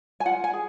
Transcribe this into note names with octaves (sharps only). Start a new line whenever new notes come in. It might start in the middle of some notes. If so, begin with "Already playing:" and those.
G#5
F4 F#5
G#5
G#4